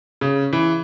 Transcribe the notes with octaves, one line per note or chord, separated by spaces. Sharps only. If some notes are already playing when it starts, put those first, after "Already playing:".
C#3
E3